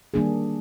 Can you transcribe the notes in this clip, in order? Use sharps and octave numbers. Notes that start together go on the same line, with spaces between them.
D#3 G3 A#3 D4 G#4